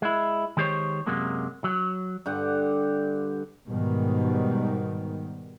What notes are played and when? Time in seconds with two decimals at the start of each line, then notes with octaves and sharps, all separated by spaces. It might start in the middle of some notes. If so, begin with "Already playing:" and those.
0.02 G#3 E4
0.57 D#3 G#3 G4 C5 C#5
1.07 F#2 C3 F#3 G#3 A#3
1.64 F#3
2.26 G2 D3 G4 F#5
3.68 G#2 B2 D#3 G3